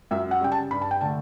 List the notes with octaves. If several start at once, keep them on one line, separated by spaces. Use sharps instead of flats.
F#2 E5
F#5
C#3 G3 G5
A5
G2 B5
A5
G5
D3 A3 A5